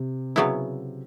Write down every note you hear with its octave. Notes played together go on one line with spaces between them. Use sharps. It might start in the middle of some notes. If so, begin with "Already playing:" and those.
Already playing: C3
C#3 F#3 B3 E4